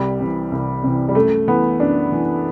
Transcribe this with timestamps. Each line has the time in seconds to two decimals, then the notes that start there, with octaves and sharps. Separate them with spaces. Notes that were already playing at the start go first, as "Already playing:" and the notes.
Already playing: C2 G3
0.20 C3 E3
0.52 C2
0.83 C3 E3
1.09 G3
1.15 F#2 A3
1.47 E3 B3
1.79 F#2 D4
2.12 E3